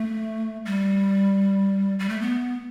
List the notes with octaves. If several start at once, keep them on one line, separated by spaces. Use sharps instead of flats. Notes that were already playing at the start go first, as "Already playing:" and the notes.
Already playing: A3
G3
G3
A3
B3